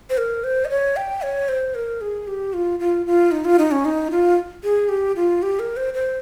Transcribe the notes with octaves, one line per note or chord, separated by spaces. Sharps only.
C5
A#4
C5
D#5
C#5
G5
C#5
C5
A#4
G#4
G4
F4
F4
F4
D#4
F4
D#4
C#4
D#4
F4
G#4
G4
F4
G4
A#4
C5
C5